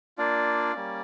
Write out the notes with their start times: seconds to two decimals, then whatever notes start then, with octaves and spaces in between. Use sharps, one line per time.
0.18 A#3 D4 F4 D5
0.74 G3 A#3 C#4